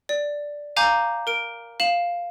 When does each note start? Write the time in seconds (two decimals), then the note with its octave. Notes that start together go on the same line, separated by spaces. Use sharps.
0.09 D5
0.76 F5 G#5 A#5 D6 G6
1.27 A#4 D7
1.80 F5 E7 F#7